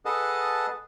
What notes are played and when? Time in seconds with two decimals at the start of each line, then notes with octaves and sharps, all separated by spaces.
0.06 G#4 A4 B4 D#5 F#5 A5